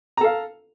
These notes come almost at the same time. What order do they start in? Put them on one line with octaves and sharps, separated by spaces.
A#5 A4 F5